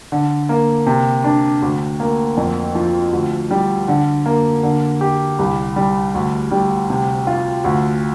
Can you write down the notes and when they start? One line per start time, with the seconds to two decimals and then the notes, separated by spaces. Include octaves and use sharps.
0.12 D3
0.49 A#3
0.86 C3
1.24 D4
1.62 D2
2.00 A#3
2.37 F2
2.75 F3
3.13 D2
3.51 G3
3.88 D3
4.26 A#3
4.63 D3
5.01 G4
5.39 C2
5.76 G3
6.14 D2
6.51 G3
6.90 C3
7.27 F4
7.64 D2